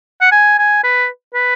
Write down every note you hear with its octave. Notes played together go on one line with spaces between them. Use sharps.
F#5
G#5
G#5
B4
B4